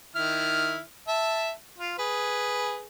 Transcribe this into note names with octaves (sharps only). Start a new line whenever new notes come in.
D#3 E4 F6
E5 A5
F4
G#4 B4